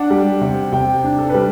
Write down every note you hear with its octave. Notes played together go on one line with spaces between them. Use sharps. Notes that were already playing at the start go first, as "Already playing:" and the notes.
Already playing: D4 F#5
G3
C3
C3 G5
D4
A4
G3 B4